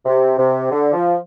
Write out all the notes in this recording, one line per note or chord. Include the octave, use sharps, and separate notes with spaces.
C3
C3
D3
F3